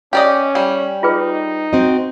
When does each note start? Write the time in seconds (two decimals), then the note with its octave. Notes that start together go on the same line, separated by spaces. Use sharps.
0.13 C#4 G4 D5 D#5
0.55 G3
1.03 D#4 F4 G#4 B4
1.73 C4 F#4 D#5